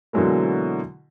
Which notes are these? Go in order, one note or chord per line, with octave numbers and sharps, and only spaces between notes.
B2 D3 E3 F#3 G#3 A#3